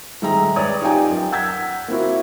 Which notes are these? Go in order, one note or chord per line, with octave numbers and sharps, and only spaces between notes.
D#1 G#3 E5 G5 A#5
B4 C#5 D5 D#6 G#6
D#4 F4 G4 D5 G5 G#5
F#2
F#5 E6 G6 G#6 B6
A#3 C4 E4 F#4